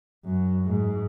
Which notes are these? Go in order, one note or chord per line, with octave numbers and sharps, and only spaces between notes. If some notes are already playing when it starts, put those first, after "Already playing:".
F#2
G#2